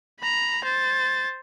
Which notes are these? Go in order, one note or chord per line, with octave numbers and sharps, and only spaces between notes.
A#5 B5
C5 A6